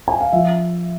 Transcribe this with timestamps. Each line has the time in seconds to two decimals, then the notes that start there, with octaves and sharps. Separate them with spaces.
0.08 G#5
0.21 F5
0.32 F3 E5